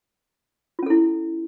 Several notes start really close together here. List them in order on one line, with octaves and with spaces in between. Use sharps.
F4 C#4 A4 E4